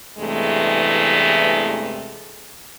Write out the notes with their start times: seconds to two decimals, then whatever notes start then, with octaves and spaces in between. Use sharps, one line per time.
0.18 E2 G2 C3 E3 G#3 A3